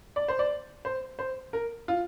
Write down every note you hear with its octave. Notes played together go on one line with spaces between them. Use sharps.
D5
C5
D5
C5
C5
A#4
F4